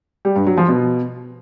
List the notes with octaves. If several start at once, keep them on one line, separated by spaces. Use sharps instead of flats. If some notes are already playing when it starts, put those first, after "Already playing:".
G3
G2
F#3
F3
B2